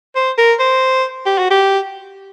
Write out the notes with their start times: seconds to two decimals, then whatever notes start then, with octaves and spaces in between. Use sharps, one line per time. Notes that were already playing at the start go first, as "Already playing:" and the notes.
0.16 C5
0.38 A#4
0.60 C5
1.26 G4
1.38 F#4
1.51 G4